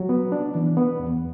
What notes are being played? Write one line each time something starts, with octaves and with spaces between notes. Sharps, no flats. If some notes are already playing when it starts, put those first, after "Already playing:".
Already playing: F#3
B3
D4
E3
B3
E2